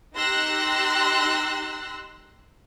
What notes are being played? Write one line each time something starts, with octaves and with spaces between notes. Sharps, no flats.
D#4 G4 C6 E6 F#6 A#6